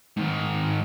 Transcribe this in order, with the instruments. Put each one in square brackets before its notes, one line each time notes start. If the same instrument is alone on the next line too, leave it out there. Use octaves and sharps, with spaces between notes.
[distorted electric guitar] G#2 D#3